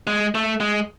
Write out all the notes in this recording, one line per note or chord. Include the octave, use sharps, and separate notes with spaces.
G#3
A3
G#3